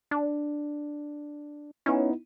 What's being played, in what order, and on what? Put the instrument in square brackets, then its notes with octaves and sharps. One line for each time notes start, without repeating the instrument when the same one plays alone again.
[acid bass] D4
[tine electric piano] B3 D#4 E4 [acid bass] C#4